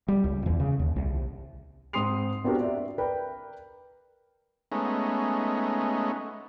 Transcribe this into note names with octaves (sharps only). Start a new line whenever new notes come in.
G3
C#2
E2
C#3
D#2
C2
G#2 C4 C6 D#6 C7 F7
B3 C4 D4 F#4 G4 A#4
D5 E5
A#4 B4 D5 G5 B5
G#3 A3 B3 C#4 D#4